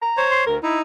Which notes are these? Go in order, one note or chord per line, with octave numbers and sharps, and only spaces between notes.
A#5
C5 C#5
C6
D2 A#4
D#4 E4